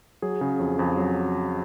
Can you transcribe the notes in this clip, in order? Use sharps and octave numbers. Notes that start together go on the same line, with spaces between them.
F#3 G#4
C#3
F2
F2 G#4
F#3